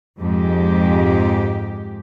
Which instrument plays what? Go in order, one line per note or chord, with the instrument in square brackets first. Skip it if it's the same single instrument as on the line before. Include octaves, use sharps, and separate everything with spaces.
[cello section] F2 G#2 G#3 G4